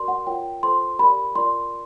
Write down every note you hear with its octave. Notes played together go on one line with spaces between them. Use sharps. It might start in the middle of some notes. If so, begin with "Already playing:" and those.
Already playing: F#4 A#4 D5 C6
F#5
F4 A#4 C#5 G5
F4 A4 C5 C6
G4 A#4 D5 B5
F4 A#4 D5 C6